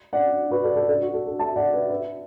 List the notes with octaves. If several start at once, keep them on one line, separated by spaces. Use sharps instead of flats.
D5 F#5
F#4 B4
A4 D5
A4 D5
A4 D5
F#4
A4
A4
E5 A5
D5 F#5
B4 E5
B4 E5